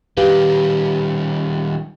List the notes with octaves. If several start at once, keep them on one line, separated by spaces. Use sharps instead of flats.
D#3 G3 G4 B4 F5